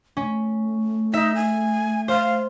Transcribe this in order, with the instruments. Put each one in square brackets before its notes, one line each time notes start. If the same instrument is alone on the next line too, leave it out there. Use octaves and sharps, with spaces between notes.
[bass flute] A3 [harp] C#4
[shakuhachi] D#4 [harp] E5
[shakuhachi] G#5
[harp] C5 [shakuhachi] F5